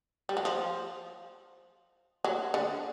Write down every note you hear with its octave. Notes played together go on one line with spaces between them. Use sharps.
G3
F#3
F3
F#3
D3